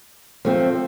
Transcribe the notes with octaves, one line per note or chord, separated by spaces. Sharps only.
F3 A3 C4